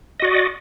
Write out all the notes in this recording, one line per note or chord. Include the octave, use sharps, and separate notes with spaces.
F#4 D5 D#5